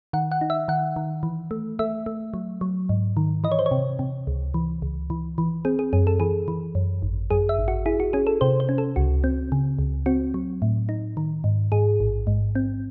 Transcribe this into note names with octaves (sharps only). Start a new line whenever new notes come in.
D#3 F#5
F#5
D#4
E5
D#3 F#5
D#3
E3
A3
A3 E5
A3
F#3
F#3
G#2
D#3
E3 D#5
C#5
C5
C#5
C3
C3
C#2
E3
C#2
E3
E3
C4 G#4
G#4
F#2 G#4
A4
E3 G#4
E3
F#2
G#1
F#2 G#4
E5
G#1
F#4
E4 G#4
F#4
C#4 G#4
A4
C3 C5
C5
C#4
A4
C#2 F#4
C4
C#3
C#2
C4 F#4
F#3
A2
D#4
D#3
G#2
G#2 G#4
A1
G#2
C4